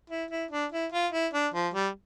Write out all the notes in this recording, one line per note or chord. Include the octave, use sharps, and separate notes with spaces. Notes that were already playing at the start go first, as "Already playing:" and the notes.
E4
E4
D4
E4
F4
E4
D4
F3
G3